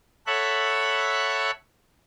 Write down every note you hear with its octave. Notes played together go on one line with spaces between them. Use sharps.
A4 C#5 E5 F#5 B5 F#6